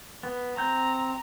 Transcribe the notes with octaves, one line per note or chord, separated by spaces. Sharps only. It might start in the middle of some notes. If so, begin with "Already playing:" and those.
B3
C4 A#5 G6